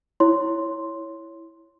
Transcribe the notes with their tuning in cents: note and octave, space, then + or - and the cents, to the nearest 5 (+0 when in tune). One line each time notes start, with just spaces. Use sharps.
E4 +0 C#5 +0 C6 +0